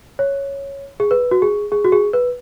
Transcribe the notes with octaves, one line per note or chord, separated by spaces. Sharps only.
C#5
G#4
B4
F#4
G#4
G#4
F#4
G#4
B4